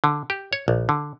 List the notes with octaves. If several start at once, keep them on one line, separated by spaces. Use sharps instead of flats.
D3
G4
C#5
A#1
D3